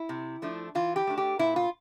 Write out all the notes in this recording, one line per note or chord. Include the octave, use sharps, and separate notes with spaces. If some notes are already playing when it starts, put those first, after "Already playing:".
Already playing: E4
C3
F3 A3 D4
E3 F4
G4
A3 D4
G4
A#2 E4
F4